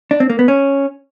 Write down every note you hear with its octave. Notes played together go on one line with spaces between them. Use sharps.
D4
C4
A#3
B3
C#4